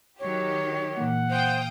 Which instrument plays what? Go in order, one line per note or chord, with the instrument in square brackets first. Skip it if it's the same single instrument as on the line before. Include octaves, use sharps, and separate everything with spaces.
[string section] D#3 F#3 G4 [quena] C#5
[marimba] A#2 E3 A#3 [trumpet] F#5
[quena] C5 [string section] F5 G5 D#6